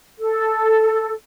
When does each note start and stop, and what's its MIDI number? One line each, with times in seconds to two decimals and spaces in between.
0.19 1.12 69